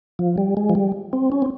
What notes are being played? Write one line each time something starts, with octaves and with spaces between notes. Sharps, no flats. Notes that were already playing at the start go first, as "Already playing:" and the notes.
F3
G3
G#3
F3
G3
C4
C#4
C4